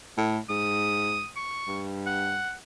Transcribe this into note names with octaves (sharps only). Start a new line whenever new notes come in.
A2
G#2 D#6
C#6
G2
F#5